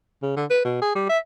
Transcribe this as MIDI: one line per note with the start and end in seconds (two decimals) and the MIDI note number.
0.22 0.35 49
0.37 0.45 50
0.50 0.62 71
0.65 0.79 47
0.82 0.95 68
0.95 1.09 55
1.09 1.18 76